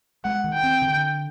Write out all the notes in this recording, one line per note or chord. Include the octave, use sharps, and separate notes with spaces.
G#3 F#5
D#3
G5
C4
D3